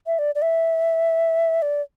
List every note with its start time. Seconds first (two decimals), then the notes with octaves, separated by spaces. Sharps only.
0.07 E5
0.19 D5
0.35 D5
0.42 E5
1.62 D5